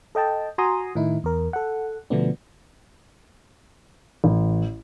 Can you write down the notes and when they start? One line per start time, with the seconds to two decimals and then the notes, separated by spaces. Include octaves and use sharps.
0.15 A4 D#5 G5 A5
0.58 F#4 G#5 A#5 C6 D#6
0.95 A2 D#3 D#4 E4
1.24 E2 A#4
1.53 A4 F#5
2.10 B2 D3 F3 A3 B3 D4
4.24 A1